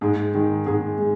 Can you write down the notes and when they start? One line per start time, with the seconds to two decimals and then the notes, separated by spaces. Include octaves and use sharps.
0.01 G#2 G#4
0.34 D#3 G#3
0.66 G#2 G#4
0.99 G#3